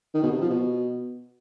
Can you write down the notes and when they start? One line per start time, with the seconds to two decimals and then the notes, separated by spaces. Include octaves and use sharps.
0.14 D#3
0.23 B2
0.32 C3
0.41 F3
0.50 B2